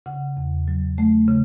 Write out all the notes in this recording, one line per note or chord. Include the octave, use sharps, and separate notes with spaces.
C#3 F#5
E2
F#3
A3
C#3